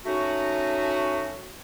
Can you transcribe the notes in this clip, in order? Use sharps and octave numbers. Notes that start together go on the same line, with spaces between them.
A3 C#4 D#4 F#4